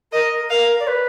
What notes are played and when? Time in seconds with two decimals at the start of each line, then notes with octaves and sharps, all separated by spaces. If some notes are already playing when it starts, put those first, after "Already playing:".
0.13 A#4 D#5
0.50 A#4 F5
0.80 D5
0.87 B4